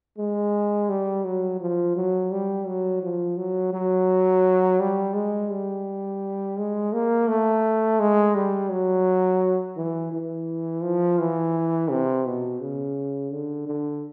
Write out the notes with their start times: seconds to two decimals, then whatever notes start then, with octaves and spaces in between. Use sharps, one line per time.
0.18 G#3
0.89 G3
1.25 F#3
1.61 F3
1.96 F#3
2.31 G3
2.67 F#3
3.03 F3
3.37 F#3
3.73 F#3
4.80 G3
5.15 G#3
5.51 G3
6.58 G#3
6.93 A#3
7.28 A3
8.00 G#3
8.35 G3
8.70 F#3
9.77 E3
10.13 E3
10.83 F3
11.19 E3
11.90 C3
12.25 B2
12.60 C#3
13.31 D3
13.67 D3